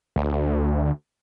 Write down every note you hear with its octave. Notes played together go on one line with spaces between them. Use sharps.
D2